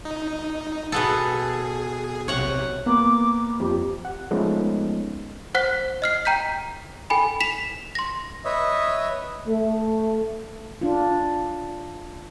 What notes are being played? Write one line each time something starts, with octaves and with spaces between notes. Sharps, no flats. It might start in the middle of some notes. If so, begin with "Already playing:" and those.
D#4
B2 B3 G#4 A4
B1 C3 C#5 F#5
A#3 B3 D6
F2 G4
F#5
F3 G#3 A3 B3 C#4 D#4
C5 F#5 F#6 B6
D#5 F6 C7
G5 A#5 G6 B6
A4 G5 G#5 B5
B6 E7 F7
C6 A#6
B4 C#5 D#5 E5
A3
D4 F4